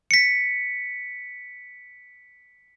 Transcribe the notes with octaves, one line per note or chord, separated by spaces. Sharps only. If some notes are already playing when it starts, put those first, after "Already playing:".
B6 C#7